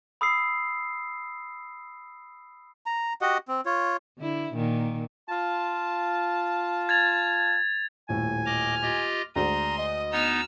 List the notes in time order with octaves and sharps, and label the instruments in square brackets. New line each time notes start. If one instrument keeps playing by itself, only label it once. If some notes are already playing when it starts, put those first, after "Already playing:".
[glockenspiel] B5 D#6 E6 C7
[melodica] A#5
F#4 G4 D#5 F#5
C4
F4 C#5
[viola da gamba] D3 E4
A#2 D#3
[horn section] F4 A5
[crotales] G#6 A6 F7
[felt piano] D#1 A2 [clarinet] G#5
[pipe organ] D#5 D6 [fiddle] F6
[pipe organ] F4 G4 D#5
[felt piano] D2 G#3 D5 [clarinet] A#5 [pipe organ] C6 [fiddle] D#6
[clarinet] D#5
[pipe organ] B3 D#4 [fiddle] E6 F6